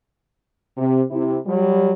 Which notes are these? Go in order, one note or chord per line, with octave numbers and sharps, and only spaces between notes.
C3
C3 E4
F#3 G3